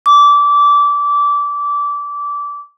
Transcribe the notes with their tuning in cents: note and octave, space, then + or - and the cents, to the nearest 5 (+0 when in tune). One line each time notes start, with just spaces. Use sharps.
D6 -20